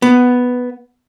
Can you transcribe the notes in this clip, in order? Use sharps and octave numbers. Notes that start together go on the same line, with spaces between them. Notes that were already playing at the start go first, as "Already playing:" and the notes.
B3